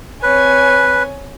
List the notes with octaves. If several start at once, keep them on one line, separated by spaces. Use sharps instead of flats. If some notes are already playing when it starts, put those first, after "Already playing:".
C4 B4 C#5 G#5